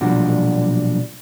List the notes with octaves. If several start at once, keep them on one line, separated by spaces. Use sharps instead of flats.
B1 A#2 F3 G3 D4 F#4